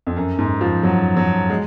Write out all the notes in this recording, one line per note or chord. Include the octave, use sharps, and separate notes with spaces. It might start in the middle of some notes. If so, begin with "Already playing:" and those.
F2
F#2
G#2
F3
F#3
F#3
G#3